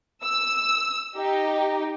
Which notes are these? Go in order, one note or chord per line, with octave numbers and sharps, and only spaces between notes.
E6
D#4 G4